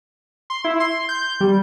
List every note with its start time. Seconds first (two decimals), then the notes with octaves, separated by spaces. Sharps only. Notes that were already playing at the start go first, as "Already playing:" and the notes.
0.50 C6
0.65 E4
0.80 C6
1.09 G6
1.41 G3